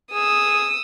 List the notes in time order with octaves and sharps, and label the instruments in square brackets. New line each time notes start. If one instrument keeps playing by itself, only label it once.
[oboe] G#4 [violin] D#6 E6